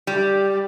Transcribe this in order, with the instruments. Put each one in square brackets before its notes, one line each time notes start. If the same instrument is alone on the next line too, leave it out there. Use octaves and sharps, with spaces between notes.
[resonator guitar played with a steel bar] G3